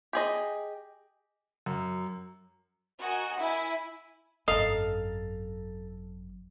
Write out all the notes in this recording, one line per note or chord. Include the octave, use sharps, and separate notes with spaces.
G4 G#4 D#5
F#2
F#4 A#4 D#5 G#5
E4 G#5
G#1 F#2 A4 D#5 F5 A#5